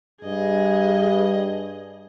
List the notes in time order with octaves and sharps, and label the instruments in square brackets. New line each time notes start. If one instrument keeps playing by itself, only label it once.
[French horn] G2 [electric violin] G#4 D#5